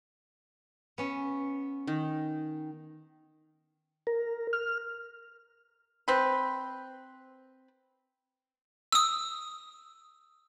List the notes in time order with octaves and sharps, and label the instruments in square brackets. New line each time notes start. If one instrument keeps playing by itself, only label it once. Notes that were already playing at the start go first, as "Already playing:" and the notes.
[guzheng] B3 C#4
[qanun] D#3
[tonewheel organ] A#4
F6
[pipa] C4 B4
[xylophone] D#6 E6